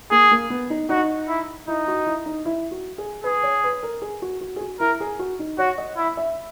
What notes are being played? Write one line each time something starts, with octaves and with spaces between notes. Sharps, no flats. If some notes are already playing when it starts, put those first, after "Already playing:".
A#3 G#4
A#3
B3
D#4
D#4 F#4
E4
D#4 E4
F#4
E4
D#4
E4
F#4
G#4
G#4 B4
C#5
B4
A#4
G#4
F#4
F#4
G#4
F#4
E4 A#4
G#4
F#4
D#4
F#4 C#5
D#5
E4
E5